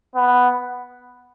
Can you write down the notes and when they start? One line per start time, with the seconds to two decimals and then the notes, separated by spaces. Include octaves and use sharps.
0.15 B3